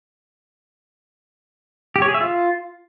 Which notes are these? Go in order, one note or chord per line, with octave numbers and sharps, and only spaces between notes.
G4
C#5
G#4
E5
F4